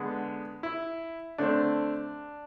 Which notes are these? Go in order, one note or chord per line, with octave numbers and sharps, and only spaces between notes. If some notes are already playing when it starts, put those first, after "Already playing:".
Already playing: D3 G#3 B3
E4
D3 A3 C4 D4